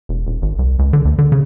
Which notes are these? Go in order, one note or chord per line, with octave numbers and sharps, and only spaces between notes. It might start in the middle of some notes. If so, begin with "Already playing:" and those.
E1
D#1
G#1
C2
C#2
D3
D2
D3
C#3